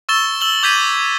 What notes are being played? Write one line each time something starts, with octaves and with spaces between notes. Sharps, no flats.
C#6 E6 A6 E7 G7
E6 F#7 G7
D6 G6 G#6 B6 D#7